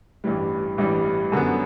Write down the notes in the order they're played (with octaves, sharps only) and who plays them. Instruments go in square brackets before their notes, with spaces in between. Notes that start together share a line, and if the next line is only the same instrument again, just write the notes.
[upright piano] A1 G2 E3 G3
A1 G2 E3 G3
F#2 D3 F#3 B3